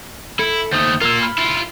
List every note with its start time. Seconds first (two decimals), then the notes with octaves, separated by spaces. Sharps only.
0.39 E4 A4
0.73 D#2 A3 C5 D#6
1.02 A#3 F4 A#4 E6
1.22 B5 F6
1.38 E4 F4